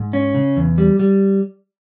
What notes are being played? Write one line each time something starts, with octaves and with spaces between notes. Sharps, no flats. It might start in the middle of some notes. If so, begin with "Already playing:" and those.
Already playing: G#2
C#4
C#3
E2
G3
G3